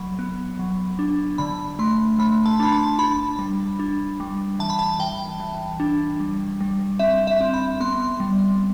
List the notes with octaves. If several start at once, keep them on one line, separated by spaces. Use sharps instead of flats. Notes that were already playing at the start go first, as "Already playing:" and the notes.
Already playing: F#3 B5
B3
F#3
D4
D3 B5
A3 C6
A3 B5
A5
D4 B5
A5
D4 B5
G3
D4
G3
E3 A5
B5
A5
E3 G5
E3
D4
G3
G3
C4 E5
E5
C4
B5
B3 C6
C6
G3